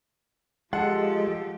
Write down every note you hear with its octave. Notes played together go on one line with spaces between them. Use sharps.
F3 G#3 F4 G4 A4 F#5